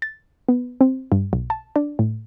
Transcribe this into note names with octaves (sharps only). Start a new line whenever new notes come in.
A6
B3
C4
G2
B1
A5
D4
A2